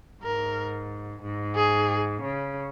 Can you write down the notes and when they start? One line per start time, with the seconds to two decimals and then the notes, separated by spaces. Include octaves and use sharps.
0.23 G#2 A#4
1.23 G#2
1.56 G#4
2.23 C#3